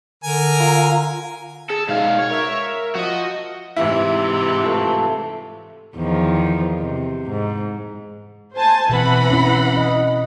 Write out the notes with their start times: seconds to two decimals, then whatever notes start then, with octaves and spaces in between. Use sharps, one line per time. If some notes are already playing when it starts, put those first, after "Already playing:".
0.24 D3 A#4 G#5
0.60 F4 F5 A#5
1.70 G#4 A4
1.89 G#2 B2 F5
2.19 C#5
2.30 A#4 E5
2.96 F3 F#4 D#5
3.76 G#2 C3 E3 E4
4.61 F3 A3
5.97 E2 D#3 F3
6.80 C3
7.30 G#2
8.55 C5 G#5 A5
8.89 B2 E3 C4 F#5 B5
9.30 C#4 E4
9.77 D#5